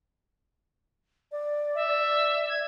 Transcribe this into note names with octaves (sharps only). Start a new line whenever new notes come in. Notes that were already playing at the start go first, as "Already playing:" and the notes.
D5
E5
G#6